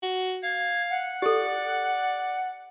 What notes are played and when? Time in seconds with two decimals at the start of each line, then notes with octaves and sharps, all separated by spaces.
0.02 F#4
0.43 F5 G#6
0.90 F#5
1.22 G4 A4 D5